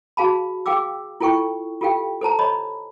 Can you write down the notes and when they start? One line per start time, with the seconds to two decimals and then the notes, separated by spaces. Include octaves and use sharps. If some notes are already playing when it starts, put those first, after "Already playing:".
0.17 F#4 G#4 F5 A5 B5
0.66 G#4 F5 G5 D6 E6
1.20 E4 F4 A4 G5 C#6
1.81 F4 G4 A4 F5 G5
2.21 A4 C5 A5 A#5
2.39 C#5 D#5 B5